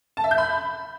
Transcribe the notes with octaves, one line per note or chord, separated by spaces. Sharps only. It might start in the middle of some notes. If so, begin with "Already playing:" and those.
A5
E5
G6
B5